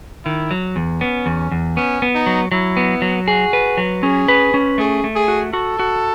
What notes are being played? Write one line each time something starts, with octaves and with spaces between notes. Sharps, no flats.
D#3 E4
F#3
E2
B3 C#4
E2
E2
B3 C#4
B3
D#4
F#3
F#3 E4
B3
F#3
F#4 G#4
B4
F#3
C#4 G#4
B4
C#4
A3 G#4
A3
G#4
F#4
F#4 A4
F#4